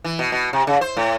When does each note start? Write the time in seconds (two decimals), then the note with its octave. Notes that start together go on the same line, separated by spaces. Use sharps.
0.04 E3
0.19 B2
0.32 B2
0.53 C3
0.67 C#3
0.81 C5
0.97 A2